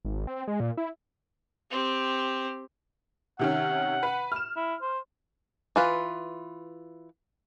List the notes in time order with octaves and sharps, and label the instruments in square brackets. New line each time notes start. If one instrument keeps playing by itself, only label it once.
[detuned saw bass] G#1
C4
G#3
A#2
E4
[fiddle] C4 G4
[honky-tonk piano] C3 D#3 C#4 [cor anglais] F#5
[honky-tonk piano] B4
F6 E7
[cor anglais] E4
C5
[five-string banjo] E3 F4 B4